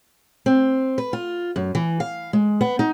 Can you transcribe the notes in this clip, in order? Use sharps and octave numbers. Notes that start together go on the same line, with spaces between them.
C4
B4
F4
F#2
E3
F5
G#3
B3
D#4